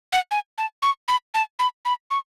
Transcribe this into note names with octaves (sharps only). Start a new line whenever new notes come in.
F#5
G#5
A5
C#6
B5
A5
B5
B5
C#6